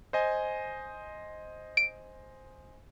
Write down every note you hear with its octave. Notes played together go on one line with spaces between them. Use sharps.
C5 D#5 G#5
D7